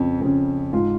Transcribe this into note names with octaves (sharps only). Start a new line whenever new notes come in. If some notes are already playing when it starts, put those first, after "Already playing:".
Already playing: F2 C#3
F2 C#3
G#2 F4